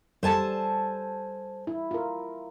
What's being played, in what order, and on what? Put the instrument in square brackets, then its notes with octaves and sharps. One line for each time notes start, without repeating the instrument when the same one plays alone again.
[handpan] G3 A4 [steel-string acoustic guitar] C5 G#5 A5
[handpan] E4
F4 A#4